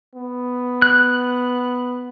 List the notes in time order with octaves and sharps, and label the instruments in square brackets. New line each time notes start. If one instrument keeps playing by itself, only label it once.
[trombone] B3
[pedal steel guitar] F#6